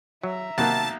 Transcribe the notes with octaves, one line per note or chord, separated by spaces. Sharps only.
F#3 E5 A#5
B1 C3 D#3 A#3 A5 F#6 A6